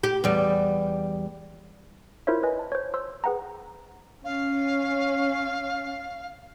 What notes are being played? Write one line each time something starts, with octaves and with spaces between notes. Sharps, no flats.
G4
E2 G3
E4 F4 A#4 C5 C#5 E5
B4 D#5 G#5
A5
C5 C#5
C5 C6 E6
G#4 B4 F#5 G5 A#5
C#4 F5